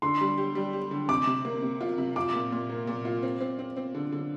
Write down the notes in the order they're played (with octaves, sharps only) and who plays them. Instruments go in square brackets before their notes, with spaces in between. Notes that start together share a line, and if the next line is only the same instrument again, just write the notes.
[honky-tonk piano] D3 [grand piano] C6
[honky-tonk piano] G3
G4
G3
G4
D3
[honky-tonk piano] C3 [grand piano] D6
[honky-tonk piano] C3
A#3
C3
F4
C3
[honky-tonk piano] F4 [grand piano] D6
[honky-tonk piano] A#2
A#2
A#3
A#2
F4
C4
C4
C4
C4
D3
D3